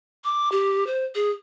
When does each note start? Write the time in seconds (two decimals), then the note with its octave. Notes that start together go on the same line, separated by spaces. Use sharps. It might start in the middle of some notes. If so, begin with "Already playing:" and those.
0.24 D6
0.52 G4
0.87 C5
1.15 G#4